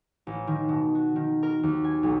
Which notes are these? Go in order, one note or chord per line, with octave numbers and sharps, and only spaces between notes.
A1
D#3
B2
F#4
D#3
A#4
D#2
G#5
B1